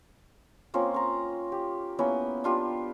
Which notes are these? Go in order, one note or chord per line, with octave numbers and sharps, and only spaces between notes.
A#3 C4 C#4 F4
A#5 C#6
G4
A#3 B3 C#4 E4
D4 F4 G4